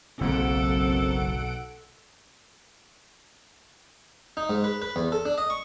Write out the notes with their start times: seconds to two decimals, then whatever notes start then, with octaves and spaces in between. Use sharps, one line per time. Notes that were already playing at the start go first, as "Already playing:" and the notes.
0.21 F#1 B1 A#3 C4 A4 F#5 D7
4.37 D#4
4.50 G#2
4.64 B4
4.82 B4
4.96 E2
5.12 A4
5.25 D4
5.38 D#5
5.50 C#6